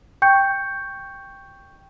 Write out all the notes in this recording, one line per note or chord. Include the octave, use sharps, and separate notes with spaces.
G5 C#6 G6 C#7